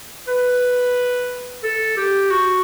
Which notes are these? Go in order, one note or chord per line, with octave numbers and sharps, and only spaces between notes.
B4
A4
G4
F#4